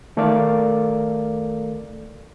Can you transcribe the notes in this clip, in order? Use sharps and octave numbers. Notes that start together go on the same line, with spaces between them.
D#3 A3 A4 A#4 D5 F5